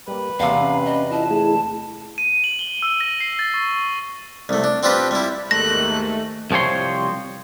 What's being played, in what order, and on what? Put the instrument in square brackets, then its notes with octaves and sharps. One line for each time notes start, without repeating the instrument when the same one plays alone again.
[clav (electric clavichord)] G3 A#3 [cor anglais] B4
[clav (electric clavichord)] E2 C3 [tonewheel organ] A#3 [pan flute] F5
[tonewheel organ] C#4
[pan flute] D#5
[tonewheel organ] E4 F4 D#5 [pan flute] A5
[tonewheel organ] A3 E4 G#4
[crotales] D#7
F#7
G7
E6
A#6
C7
A6
C#6
[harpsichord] C2 A3
D4
C4 D4 F4 G4 B4
G3 E4
[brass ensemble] D#2 G#2 D#3 [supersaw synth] A3 [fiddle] F#6 [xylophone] A#6
[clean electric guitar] C2 F3 C4 C#5 C6